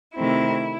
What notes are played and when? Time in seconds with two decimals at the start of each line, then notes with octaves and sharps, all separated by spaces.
0.15 C3 D#3 A3 C4 E4